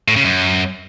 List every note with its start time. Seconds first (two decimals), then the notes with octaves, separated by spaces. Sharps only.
0.08 A2
0.16 C#3
0.24 F#2